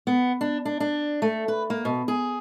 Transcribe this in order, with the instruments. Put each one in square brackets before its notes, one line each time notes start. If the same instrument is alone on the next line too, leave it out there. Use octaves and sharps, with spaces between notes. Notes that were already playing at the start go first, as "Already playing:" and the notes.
[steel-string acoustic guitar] B3
D4
D4
D4
A3
B4
A#3
B2
G#4